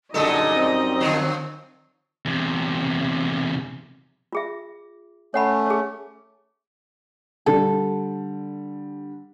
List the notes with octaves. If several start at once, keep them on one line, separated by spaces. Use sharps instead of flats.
F#2 A#2 D3 G3 G#3 D#4 A4 D#5
C4
D3 F3 F#3
E2 C3
F4 G#4 E5
A3 C#4 C#5 F#5 B5
G#4 C#5
D3 G3 A4